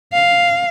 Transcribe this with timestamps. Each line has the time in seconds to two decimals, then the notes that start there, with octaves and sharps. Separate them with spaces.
0.13 F5